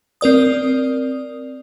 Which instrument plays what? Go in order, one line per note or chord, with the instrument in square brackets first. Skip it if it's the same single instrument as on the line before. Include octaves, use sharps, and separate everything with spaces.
[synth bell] C4 A#4 D5 D#6